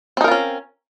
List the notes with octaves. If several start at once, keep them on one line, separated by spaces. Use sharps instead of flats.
C4 C#4 D#4 F4 A#4